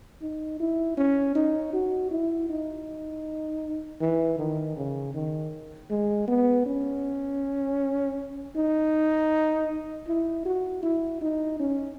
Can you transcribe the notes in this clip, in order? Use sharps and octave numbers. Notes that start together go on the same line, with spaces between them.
D#4
E4
C#4
D#4
F#4
E4
D#4
E3
D#3
C#3
D#3
G#3
B3
C#4
D#4
E4
F#4
E4
D#4
C#4